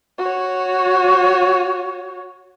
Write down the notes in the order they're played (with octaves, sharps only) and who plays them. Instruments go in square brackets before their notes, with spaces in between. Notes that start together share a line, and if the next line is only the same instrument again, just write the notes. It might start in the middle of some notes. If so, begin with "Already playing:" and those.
[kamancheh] F#4 C#5